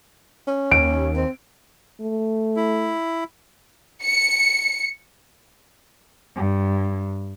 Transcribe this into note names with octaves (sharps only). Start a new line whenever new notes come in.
C#4
D#2 D7
C4
A3
E4
C#7
G2